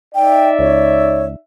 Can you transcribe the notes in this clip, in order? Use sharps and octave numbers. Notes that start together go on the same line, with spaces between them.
D#4 D5 E5 G5
C#2 C#5